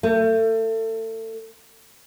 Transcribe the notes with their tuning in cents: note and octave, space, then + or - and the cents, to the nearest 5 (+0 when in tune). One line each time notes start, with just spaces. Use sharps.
A3 +30